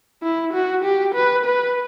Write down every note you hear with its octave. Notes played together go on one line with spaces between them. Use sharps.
E4
F#4
G4
B4
B4